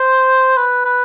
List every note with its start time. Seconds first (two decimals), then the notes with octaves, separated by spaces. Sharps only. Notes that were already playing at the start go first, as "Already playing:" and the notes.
Already playing: C5
0.57 B4
0.85 B4